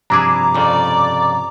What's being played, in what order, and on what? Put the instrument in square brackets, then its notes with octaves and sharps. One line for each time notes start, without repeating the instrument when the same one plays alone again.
[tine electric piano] G2 C3 F3 [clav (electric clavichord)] D4 E4 G#4 [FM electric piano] A#5 D6
[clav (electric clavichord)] F2 C#3 [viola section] D5